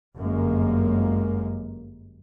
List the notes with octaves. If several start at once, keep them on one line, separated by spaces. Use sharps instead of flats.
G1 F#2 G#3 A#3